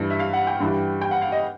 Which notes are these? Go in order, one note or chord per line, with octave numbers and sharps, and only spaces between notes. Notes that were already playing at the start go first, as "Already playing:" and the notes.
Already playing: G2 E3 G3
E5
F5
F#5
G5
G2 E3 G3
G5
F#5
F5
D#5